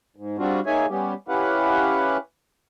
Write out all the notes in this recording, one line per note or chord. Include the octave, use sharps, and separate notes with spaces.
G#2
G3 C4 D4 F4 F#4
A#3 D#4 G#4 C#5 E5 G#5
G3 B3 C#4 G4
C#4 E4 G4 B4 F5 F#5